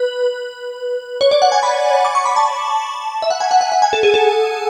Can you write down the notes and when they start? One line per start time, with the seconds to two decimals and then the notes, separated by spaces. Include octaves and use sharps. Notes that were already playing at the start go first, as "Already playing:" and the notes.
Already playing: B4
1.21 C#5
1.31 D5
1.42 F#5
1.52 G#5
1.63 B5
2.05 D6
2.15 C#6
2.25 B5
2.36 A5
3.22 E5
3.30 F#5
3.40 G#5
3.51 F#5
3.61 F#5
3.72 F#5
3.82 G#5
3.93 A4
4.03 G#4
4.14 A4